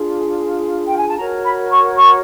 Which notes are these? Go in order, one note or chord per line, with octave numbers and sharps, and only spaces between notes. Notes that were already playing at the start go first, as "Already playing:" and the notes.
Already playing: D4 F4 G#4
G5
G#5
A5
F#4 A#4 C#5 A#5
B5
C#6
C#6